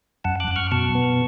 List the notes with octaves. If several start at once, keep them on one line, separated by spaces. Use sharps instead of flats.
F#2 F#5 A5
D6 F#6
F#2
C#6 F6
B2 A5 C#6
B3